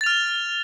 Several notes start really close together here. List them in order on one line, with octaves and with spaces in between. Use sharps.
A6 F7 F6